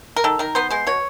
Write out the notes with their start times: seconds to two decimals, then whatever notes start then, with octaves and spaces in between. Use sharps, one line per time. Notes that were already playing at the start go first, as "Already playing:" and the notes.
0.16 A#4
0.24 D#3 A4
0.39 D#3 A#4
0.55 B3 C5
0.70 G#3 C5
0.87 B2 C#5